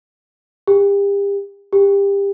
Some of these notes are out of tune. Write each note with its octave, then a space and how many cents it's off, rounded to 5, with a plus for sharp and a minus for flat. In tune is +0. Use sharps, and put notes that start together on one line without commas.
G4 +35
G4 +25